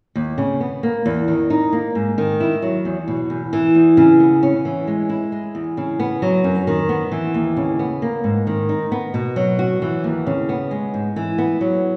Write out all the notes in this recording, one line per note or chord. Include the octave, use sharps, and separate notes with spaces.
D#2
C#3
B3
A#3
E2
D#3
D#4
A#3
G#2
D#3
E4
F#3
E2
B2
E2
E3
E2
C#3
B3
C#4
E3
G#3
E4
G#3
E2
C#3
B3
F#3
F#2
D#3
B3
E3
D#2
C#3
B3
A#3
G#2
D#3
D#4
B3
B2
F#3
F#4
E3
D#2
C#3
B3
G#3
G#2
E3
B3
F#3